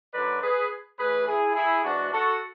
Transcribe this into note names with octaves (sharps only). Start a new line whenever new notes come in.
F#2 D3 F#3 B4 D5
G#4 B4
A2 E3 G#4 B4
E4 G#4
E4 G#4
G#2 E3 D4 F#4
F#4 A4